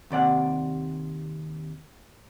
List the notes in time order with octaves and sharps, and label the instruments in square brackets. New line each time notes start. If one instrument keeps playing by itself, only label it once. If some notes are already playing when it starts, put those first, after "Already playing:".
[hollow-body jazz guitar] D#2 C3 D5 F#5